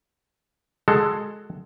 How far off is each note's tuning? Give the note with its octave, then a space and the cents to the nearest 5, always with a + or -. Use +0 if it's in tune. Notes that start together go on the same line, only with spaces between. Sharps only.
G#3 +10 F#4 +5 A4 +10